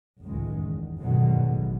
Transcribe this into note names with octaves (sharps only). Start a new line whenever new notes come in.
F#1 C#2 A2 D#3 G#3
E2
G2 B2 D3 D#3 F#3 G#3
A1